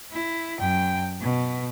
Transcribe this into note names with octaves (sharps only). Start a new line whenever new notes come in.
E4
F#2 G5
B2